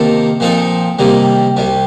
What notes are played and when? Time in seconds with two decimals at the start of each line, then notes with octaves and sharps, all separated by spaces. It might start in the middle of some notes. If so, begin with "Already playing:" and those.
Already playing: C3 D#3 A#3 F4 A4
0.40 A#2 F3 C4 D#4 A4
0.99 C3 D#3 G3 A#3
1.57 C2 C3 G3